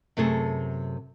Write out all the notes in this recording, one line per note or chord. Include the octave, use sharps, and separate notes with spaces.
F#2 C3 A3 G#4 A4